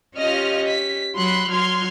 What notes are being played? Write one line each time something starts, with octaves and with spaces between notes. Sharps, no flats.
C#4 F4 G4 D#5 F6
B6
F#3 B5 C6 F#6
F#3 C6 F6 G#6